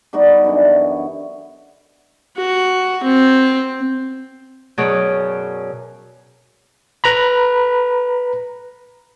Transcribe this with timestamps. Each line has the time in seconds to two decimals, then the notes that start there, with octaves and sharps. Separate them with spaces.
0.13 G3 B3 D#4 F#4
0.44 F#2 D3 E3
2.37 F#4
3.03 C4
4.78 F#2 B2 B3 G#4 C#5 D5
7.04 B4 A#5 B5